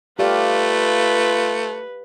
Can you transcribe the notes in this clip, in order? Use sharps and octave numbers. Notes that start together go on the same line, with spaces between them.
A3 F4 G4 B4 D5 F5